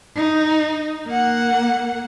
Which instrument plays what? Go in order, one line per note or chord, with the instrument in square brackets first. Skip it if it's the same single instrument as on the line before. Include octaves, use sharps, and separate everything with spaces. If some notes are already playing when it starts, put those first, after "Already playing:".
[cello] D#4
A#3 F#5